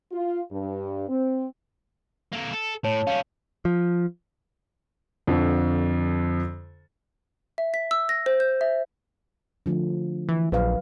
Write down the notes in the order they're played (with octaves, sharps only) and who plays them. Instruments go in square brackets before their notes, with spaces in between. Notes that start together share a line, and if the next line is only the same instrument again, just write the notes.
[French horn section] F4
G2
C4
[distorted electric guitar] A#3 A4
A4
[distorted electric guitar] A2 [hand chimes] C#5 A5
[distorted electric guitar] G3 C#4 [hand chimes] F5
[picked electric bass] F3
[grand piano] F2 D3 F3
[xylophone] E5
B6
E6
A#6
C5
G6
E5
[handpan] D3 F3 A3
[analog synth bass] E3
[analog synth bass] A#1 [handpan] F#3 B4 F5